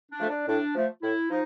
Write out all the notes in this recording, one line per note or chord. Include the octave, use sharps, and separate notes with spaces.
D4
F3 A3
D4
A2 D4
F3 A3
A2 E4
F3 D#4